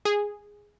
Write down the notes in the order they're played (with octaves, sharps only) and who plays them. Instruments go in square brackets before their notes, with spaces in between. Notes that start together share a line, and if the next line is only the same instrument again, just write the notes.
[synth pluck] G#4